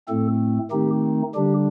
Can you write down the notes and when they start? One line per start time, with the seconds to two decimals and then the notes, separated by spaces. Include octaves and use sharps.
0.08 A2 A3 C4 A4
0.71 D#3 A3 C4 D#4 G4
1.35 D3 G3 D4 G4